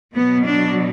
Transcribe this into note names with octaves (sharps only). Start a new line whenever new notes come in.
B2 F#3 B3
D4